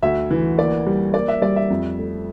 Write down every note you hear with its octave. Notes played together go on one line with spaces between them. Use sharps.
D2 E5
E3
A#3 D5
G3
A#3 D5
E5
G3 D5
E5
F2
A3